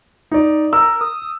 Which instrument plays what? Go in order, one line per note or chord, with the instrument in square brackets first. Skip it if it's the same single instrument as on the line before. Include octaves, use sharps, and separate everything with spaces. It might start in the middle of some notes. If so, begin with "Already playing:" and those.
[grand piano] D#4 D5
[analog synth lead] A#4 [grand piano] E6
[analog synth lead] D#6